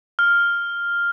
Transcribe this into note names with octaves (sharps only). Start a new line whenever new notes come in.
F6